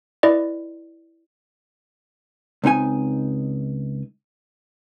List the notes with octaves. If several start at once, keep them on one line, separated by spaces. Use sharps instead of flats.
E4 B4 D5 D#5
C#2 C4 D#4 G#5